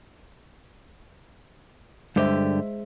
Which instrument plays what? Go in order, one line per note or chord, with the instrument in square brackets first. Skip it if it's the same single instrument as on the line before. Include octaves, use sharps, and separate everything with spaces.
[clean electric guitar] G2 D3 G4 [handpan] G#3 C5 E5